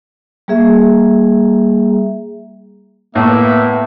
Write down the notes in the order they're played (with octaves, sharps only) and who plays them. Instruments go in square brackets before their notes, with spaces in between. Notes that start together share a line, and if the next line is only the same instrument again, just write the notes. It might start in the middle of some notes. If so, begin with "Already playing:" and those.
[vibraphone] G3 A#3 G#4 E5 A#5
[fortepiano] A2 [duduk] A#3 [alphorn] B3 [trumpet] E5